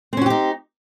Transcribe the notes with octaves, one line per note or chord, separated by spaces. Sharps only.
C4 C#4 D#4 F#4 G4